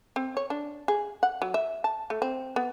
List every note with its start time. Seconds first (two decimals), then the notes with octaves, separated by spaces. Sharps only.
0.16 C4
0.37 C#5
0.50 D4
0.88 G#4
1.23 F#5
1.42 F#3
1.54 E5
1.84 A5
2.10 A3
2.22 C4
2.56 B3